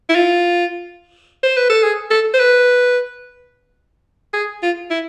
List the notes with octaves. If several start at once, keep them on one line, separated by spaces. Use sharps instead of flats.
E4
F4
C5
B4
A4
G#4
A4
C5
B4
G#4
F4
E4